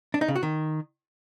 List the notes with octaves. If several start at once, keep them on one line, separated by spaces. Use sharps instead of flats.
D4
D#4
C#3
F#4
D#3